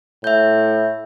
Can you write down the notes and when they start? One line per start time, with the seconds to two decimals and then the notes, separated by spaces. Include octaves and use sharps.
0.24 A2 E5 G6